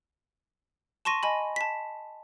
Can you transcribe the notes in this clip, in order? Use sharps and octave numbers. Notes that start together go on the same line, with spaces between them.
A5 C6 C#6 A#6 D#7
D#5 G#5 B5
A5 B6